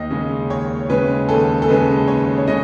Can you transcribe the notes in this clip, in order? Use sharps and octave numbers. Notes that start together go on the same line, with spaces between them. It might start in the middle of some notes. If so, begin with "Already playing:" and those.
Already playing: D#2 D#5
C#3 G#3 C#4
D#2 C#5
C#3 G#3 C#4 B4
D#2 A4
A4
C#3 G#3 C#4 B4
D#2 C#5
C#5
C#3 G#3 C#4 D#5